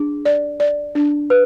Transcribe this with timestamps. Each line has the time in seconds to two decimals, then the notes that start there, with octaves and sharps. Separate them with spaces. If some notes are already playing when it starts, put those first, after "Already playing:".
Already playing: D4 G#4
0.25 D5
0.60 D5
0.95 D4
1.30 B4